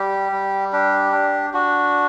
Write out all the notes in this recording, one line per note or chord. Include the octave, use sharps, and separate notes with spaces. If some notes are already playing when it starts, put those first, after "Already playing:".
Already playing: G3 G4
G3
D4 G4
D4
D4 F#4